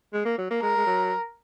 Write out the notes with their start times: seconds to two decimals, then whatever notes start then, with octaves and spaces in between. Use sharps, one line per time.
0.13 G#3
0.25 A#3
0.38 F#3
0.51 A#3
0.62 G#3 A#4
0.77 G#3
0.87 F#3